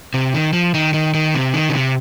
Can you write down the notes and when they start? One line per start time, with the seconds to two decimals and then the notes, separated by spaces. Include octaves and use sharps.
0.14 C3
0.34 D#3
0.53 F3
0.74 D#3
0.94 D#3
1.14 D#3
1.34 C3
1.54 D#3
1.69 C#3
1.74 C3